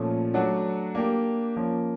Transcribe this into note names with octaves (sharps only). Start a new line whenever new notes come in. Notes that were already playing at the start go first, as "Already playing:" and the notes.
Already playing: A#2 F3 A3 C#4
F#3 A3 D4 F#4
A#3 D4 G4
F3 A#3 C#4